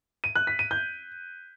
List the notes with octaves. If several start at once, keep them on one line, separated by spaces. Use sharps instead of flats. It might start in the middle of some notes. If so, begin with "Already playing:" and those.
D#7
F#6
B6
D#7
G6